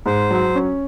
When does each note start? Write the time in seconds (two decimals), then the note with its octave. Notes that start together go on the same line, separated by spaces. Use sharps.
0.06 G#2 C5
0.31 F#3
0.55 C#4